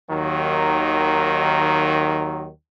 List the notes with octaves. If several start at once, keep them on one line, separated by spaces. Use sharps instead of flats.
D#2 D#3 F#3